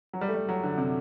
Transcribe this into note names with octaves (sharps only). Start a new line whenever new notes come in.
F#3
G3
A3
G3
F#3
D3
C3